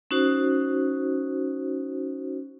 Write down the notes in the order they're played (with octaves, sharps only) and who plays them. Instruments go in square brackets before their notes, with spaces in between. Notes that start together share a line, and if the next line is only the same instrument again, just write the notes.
[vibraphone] C#4 D#4 F#4 C5